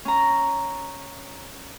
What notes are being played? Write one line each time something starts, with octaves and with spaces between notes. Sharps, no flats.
C#4 A#5